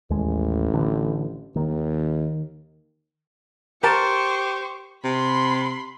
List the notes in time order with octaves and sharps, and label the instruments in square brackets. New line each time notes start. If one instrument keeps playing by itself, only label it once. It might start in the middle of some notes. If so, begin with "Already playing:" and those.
[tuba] A1 [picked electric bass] D#2 G#3
[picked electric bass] D3 E3
[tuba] D#2 [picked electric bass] D#3
[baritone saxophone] G4 [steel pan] A#4 A5 [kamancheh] C5 C#6
[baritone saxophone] C3 [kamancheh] B5 C6